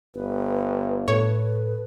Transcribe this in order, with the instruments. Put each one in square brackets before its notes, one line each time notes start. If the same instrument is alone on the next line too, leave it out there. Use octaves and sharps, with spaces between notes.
[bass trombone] G1 [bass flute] B4
[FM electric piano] A2 A4 [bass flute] B4 [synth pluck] C#5